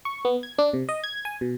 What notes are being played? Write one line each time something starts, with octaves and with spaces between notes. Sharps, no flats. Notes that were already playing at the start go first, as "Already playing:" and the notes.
C#6
B3
G#6
D4
C3
D#5
G#6
G#5
B2